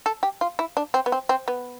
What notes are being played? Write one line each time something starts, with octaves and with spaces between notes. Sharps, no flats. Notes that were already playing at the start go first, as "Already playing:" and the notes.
A4
G4
F4
E4
D4
C4
B3
C4
C4
B3